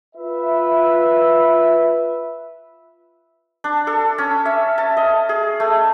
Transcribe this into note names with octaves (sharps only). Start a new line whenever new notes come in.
F4 B4 E5
D4
A4
C#4
E5
A5
D#5
G#4
A3